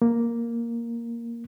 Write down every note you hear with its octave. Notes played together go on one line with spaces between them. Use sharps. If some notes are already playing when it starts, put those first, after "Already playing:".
A#3